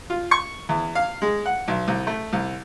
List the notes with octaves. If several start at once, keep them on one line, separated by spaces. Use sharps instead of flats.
F4
C#6
E2
F5
G#3
F#5
B1
C2
A3
C2